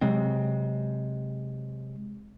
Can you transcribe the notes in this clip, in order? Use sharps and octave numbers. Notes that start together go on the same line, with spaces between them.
C3 F#3 G#3 C4